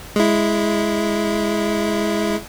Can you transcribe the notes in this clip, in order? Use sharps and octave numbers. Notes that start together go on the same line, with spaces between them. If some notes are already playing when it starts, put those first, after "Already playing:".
G#3 E4